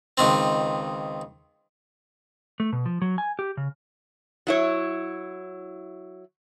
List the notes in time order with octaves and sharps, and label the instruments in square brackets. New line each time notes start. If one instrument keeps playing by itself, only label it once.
[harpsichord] C#2 D#3 C4
[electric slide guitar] A3
B2
F3
F#3
G#5
G4
C#3
[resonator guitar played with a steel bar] F#3 E4 C#5